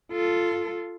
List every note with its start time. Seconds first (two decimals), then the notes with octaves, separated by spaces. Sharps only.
0.12 F4 A4